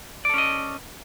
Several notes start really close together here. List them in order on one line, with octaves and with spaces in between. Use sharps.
D5 A4 C#4 D#5